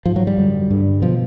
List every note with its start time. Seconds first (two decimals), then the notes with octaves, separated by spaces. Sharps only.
0.05 G#2 F3
0.16 F#3
0.27 G3
0.38 F#2 D3
0.70 G2 D3
1.02 B2 F3